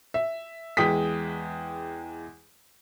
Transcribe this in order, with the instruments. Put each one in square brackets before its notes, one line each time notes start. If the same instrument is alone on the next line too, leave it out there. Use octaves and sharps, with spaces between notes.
[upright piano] E5
E2 G#3 G5 D#6 B6